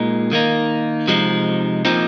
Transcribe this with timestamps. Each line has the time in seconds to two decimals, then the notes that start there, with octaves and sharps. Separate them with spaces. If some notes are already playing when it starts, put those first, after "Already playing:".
Already playing: A#2 G#3 D#4
0.32 D#3 A#3 D#4
1.08 C3 F3 G#3 D#4
1.85 A#2 F3 C4 D#4